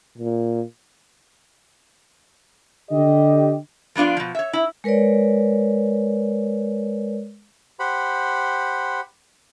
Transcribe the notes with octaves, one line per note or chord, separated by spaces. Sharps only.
A#2
D3 G4 D#5
F3 B3 D4 F4 D5
B2 F3
C#5 E5
E4
G#3 A#4 B4 C#5 D5
G4 C5 F#5 B5